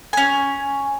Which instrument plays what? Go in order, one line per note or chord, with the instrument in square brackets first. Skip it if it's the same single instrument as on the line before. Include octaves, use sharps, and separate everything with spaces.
[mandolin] C#4 G#5